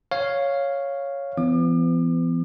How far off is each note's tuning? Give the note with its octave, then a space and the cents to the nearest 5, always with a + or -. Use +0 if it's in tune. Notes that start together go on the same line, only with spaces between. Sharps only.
C#5 +0 F5 +0
E3 +45 B3 +35 D6 +40